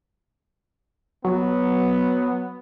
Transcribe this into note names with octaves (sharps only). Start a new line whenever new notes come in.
F#3 B3